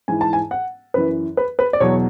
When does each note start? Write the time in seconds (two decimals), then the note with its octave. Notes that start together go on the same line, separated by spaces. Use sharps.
0.08 G#2 E3 G#5
0.21 A5
0.33 G#5
0.51 F#5
0.94 F#2 E3 B4
1.37 B4
1.59 B4
1.73 D5
1.80 E2 B2 F#3 C#5